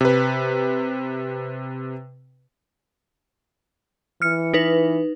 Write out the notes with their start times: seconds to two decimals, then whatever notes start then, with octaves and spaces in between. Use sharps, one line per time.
0.01 C3 B4
4.22 E3 F6 C#7
4.54 D#4 B4